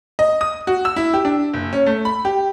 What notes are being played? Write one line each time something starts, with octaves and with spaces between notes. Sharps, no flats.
D#5
D#6
F#4
E6
E4
G4
D4
F#1
C#4
A3
B5
G4